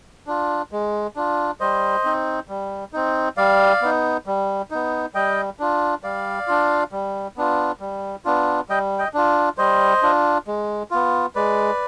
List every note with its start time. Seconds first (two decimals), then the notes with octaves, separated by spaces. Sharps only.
0.27 D4 F4
0.72 G#3
1.16 D4 F4
1.60 G3 C5 D#5
2.04 C4 D#4
2.49 G3
2.93 C4 D#4
3.37 G3 D5 F5
3.82 B3 D#4
4.27 G3
4.71 B3 D#4
5.14 G3 D#5 G5
5.59 D4 F4
6.03 G3 D5 F5
6.48 D4 F4
6.92 G3
7.37 B3 D4 F4
7.80 G3
8.25 B3 D4 F4
8.69 G3 D#5 G5
8.99 D#5 G5
9.14 D4 F4
9.58 G3 C5 D#5
10.02 D4 F4
10.47 G#3
10.91 B3 F4
11.35 G#3 B4 D5